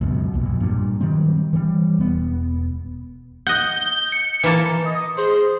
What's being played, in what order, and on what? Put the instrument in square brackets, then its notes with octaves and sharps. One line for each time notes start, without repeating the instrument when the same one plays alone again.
[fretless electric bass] C#2 F#2 B2
B1 F2 A#2
G2 A#2
D#3 F#3 G3 C4
E3 G3
E1 B3
[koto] D#5 F#5 [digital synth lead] G6
[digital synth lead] C#7
[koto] E3 A#3 A5
[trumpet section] D#5
[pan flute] G#4 [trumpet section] C5